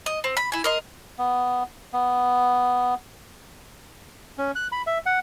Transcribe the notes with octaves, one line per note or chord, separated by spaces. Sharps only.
D#5
C4
B5
E4 G#5
A#4 D#5 C6
B3
B3
C#4
F#6
B5
E5
F#5